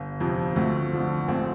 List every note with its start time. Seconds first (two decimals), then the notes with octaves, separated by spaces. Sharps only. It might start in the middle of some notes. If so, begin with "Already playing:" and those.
Already playing: G1
0.20 F2 C3 F3
0.56 D2 A3 C4
0.93 D3 F3
1.28 A1 A3 C4